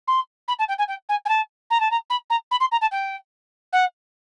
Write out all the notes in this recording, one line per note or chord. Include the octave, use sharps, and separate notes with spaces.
C6
B5
A5
G5
G#5
G5
G#5
G#5
A5
A#5
A5
A#5
B5
A#5
B5
C6
A#5
A5
G5
F#5